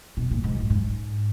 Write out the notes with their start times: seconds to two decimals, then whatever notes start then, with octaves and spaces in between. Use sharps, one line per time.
0.17 B2
0.31 A#2
0.44 G#2
0.57 F#2
0.70 G#2